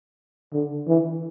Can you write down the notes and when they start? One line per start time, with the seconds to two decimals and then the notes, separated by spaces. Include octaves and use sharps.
0.54 D3
0.88 E3